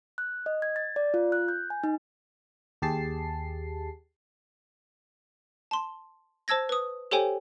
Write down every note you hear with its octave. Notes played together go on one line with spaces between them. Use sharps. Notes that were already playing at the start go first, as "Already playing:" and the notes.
F#6
D#5
G#6
A6
D5
F4
F#6
G6
G#5
D#4
D#2 G4 G#4 A5 C7
A5 C6
C5 A5 E6 G#6 A#6
B4 D#6
G4 A4 C5 C#5 G5 G#5